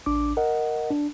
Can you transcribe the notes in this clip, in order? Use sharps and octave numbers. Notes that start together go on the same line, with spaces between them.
A1 D4 D6
A#4 D#5 F#5
D4